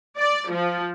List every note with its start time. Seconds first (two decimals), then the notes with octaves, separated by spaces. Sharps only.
0.18 D5
0.50 F3